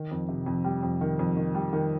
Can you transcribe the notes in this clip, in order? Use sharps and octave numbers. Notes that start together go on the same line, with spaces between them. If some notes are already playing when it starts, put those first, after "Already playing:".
Already playing: D#3
F2
C3
F2
G3
F2
D#3
F2
D#3
G3
D#3